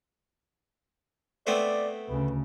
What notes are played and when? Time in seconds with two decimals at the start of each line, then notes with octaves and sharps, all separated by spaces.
1.47 A3 B3 C4 D5
2.09 D2 C#3 B4